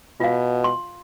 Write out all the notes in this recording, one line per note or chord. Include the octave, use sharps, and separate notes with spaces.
B2 F4 F5
C6